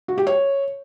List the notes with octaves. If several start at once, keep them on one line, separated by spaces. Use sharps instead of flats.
F#4
G4
C#5